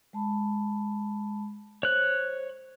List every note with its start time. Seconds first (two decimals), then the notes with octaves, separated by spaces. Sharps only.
0.13 G#3 A5 B5
1.83 C5 C#5 F#6